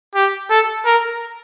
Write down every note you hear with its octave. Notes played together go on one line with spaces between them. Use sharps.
G4
A4
A#4